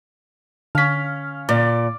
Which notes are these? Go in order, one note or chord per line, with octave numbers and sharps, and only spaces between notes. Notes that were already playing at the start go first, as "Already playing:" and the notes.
D3 C#4 F5 B6
A#2 D5